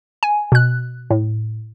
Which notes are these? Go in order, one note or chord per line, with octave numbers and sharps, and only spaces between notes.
G#5
B2 F#6
A2